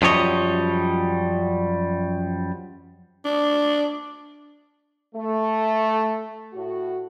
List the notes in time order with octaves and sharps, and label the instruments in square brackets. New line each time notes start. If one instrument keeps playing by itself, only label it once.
[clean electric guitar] F#2 F3 G3 C#5 D#5
[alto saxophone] D4
[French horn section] A3
A2 F#4